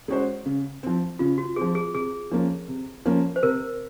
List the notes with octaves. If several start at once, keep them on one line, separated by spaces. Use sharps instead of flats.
G#3 C#4 F#4 C5
C#3
F3 C4
C#3 F4
F#4
F3 C4 G#4
G#4
C3 G#4
F3 A#3 C#4
C3
F3 A#3 C#4
C5
C3 A#4